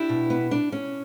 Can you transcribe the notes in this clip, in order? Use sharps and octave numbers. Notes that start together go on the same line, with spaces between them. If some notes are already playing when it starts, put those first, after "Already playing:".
Already playing: D4 E4 G4
B2
B3
D4
C#4